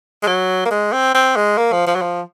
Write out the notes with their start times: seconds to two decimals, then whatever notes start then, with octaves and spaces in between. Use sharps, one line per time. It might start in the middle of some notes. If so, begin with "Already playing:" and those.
0.23 G#3
0.27 F#3
0.66 A#3
0.71 G#3
0.93 C4
1.15 C4
1.36 G#3
1.58 A#3
1.73 F3
1.87 F3
1.95 F#3
2.02 F3